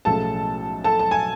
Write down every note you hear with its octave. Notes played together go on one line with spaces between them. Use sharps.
B1 A2 F3 G#3 C#4 A4 A5
A4 A5
A5
G#5